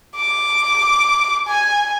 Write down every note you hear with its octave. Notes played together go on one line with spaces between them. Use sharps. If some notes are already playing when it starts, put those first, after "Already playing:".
D6
G#5